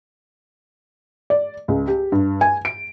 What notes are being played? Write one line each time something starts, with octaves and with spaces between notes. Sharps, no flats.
D5
C#2
G4
G2
G#5
D7